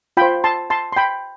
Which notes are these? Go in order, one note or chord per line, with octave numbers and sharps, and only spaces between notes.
F4 C5 G5 B5
A5 C6
A5 C6
C6
G5 B5